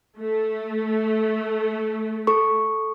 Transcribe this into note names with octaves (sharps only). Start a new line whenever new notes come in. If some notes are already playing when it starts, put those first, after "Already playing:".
A3
A4 C#6